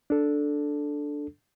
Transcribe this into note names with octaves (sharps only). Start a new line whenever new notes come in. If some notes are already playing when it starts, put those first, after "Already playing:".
D4 A4